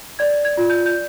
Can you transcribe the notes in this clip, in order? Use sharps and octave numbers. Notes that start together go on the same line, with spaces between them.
D5 G#6
G#6
F4
G6
G6